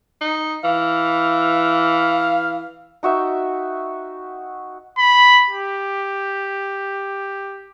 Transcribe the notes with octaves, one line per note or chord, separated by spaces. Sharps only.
D#4
E3 F5
D#4 F#4 E5 G5
B5
G4